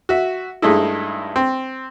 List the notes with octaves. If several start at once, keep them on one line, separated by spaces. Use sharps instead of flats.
F#4 E5
G2 G#3 A3 D#4 E4
C4